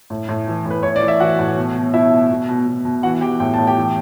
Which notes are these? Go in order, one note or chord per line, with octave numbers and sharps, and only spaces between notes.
A2
A2
E3
A2 B4
A2 C#5
D5
E3
E5
E3 F#4 F#5
A2
B2
B2
B2 E4 E5
B2
B2
B2
B2
B2
E3 F#4 F#5
E3 G4 G5
A2 G5
A2 A5
G4 G5
E3